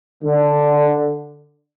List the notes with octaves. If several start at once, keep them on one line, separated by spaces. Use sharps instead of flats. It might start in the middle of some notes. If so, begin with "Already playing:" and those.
D3